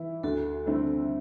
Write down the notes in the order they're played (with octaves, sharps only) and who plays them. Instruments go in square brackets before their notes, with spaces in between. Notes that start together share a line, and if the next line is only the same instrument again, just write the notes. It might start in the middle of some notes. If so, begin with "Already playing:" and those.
Already playing: [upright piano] E3 E4
[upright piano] D2 [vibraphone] F#4 A4
[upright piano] D3 A3 C4 E4